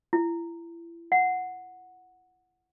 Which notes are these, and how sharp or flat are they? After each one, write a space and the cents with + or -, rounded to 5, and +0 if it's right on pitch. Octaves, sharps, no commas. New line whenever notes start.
E4 +35
F#5 -5